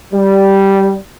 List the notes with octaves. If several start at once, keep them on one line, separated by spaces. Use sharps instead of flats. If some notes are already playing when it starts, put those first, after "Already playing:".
G3